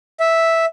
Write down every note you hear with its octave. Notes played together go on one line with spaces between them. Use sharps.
E5